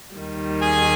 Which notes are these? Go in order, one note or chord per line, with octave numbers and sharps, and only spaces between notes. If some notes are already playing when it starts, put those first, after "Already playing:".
D#2 D#3 G3
G#4 G#5